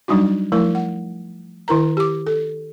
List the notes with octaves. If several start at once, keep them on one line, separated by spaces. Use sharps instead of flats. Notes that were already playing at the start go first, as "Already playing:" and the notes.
F#3 G3 D4 D#4 F#4
F3 A3 E4 A#4
F#5
D#3 E4 A#4 A#5
G4 D6
A4